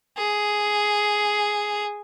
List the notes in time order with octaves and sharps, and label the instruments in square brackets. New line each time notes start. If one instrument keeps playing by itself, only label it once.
[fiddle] G#4